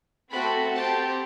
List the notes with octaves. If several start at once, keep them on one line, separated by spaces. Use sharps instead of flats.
A3 C4 F#4 A4 B5
C4 G4 A5